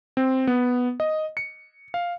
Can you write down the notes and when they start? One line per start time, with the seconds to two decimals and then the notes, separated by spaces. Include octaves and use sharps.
0.17 C4
0.47 B3
1.00 D#5
1.37 C#7
1.94 F5